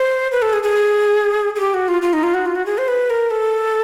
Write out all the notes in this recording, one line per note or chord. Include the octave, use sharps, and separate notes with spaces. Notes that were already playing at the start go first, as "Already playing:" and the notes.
Already playing: C5
B4
A4
G#4
G#4
G#4
G4
F#4
F4
F4
D#4
F4
F#4
F4
F#4
G#4
C5
B4
A#4
A4